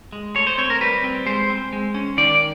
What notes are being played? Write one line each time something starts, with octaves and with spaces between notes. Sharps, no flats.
G#3
A3 C#5
C5
C4 C#5
A#4
G3 B4
C4
G#3 C5
C4
G#3
C#4
D#3 D5